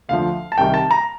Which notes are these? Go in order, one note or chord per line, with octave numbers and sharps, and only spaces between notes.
D2 D3 F3 F5
A5
C2 C3 D#3 G3 G5
A5
A#5